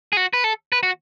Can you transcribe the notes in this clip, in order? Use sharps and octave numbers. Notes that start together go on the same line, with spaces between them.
G#4
F#4
B4
A4
B4
F#4